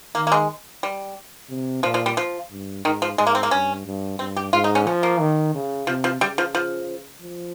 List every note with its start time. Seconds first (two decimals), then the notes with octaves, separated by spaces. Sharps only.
0.15 D#3 A#3
0.27 A#3
0.32 G#3
0.83 G3
1.49 C3
1.83 A#2 F3
1.94 F3
2.06 G3
2.17 F3
2.51 G2
2.85 G#2 D#3
3.02 F3
3.18 G#2 G#3
3.27 A#3
3.35 C4
3.43 A#3
3.51 G2 C#4
3.86 G2
4.19 G2 C4
4.36 G4
4.53 G#2 F4
4.64 D#4
4.75 C#4
4.87 F3 C#4
5.03 A#3
5.20 D#3
5.54 C#3
5.87 C3 F3
6.04 F3
6.21 C#3 G3
6.38 F3
6.55 F3
7.22 F3